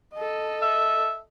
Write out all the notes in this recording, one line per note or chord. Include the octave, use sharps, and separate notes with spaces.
A4 D#5
E5